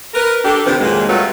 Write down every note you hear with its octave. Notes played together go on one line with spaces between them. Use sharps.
A#4 B4
D4 G4 A4
C3 D#3 F3 C4 D4 B4
F2 A#2 D#3 F#3 G#3
F#3 G3 A3 F4 B4 C#5